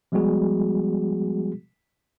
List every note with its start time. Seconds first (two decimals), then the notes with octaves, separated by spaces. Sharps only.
0.12 F3 G3 G#3 B3 F#4 G#4